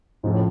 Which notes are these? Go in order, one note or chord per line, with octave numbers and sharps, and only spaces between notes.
F2 G#2 C#3 F3 A3
A2